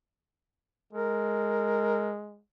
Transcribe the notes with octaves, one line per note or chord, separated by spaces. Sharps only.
G#3 A#4